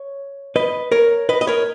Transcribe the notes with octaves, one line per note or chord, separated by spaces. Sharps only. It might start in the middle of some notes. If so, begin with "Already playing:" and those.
Already playing: C#5
B4 D#5
A#4 C#5
B4 D#5
D#5
A#4 C#5